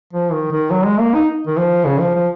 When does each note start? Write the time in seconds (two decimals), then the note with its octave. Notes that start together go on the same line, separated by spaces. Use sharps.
0.13 F3
0.32 D#3
0.51 D#3
0.70 F#3
0.85 G#3
0.99 A#3
1.14 D#4
1.47 D#3
1.57 F3
1.86 C#3
2.00 F3
2.15 F3